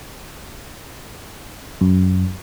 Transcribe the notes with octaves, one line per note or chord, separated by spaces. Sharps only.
F#2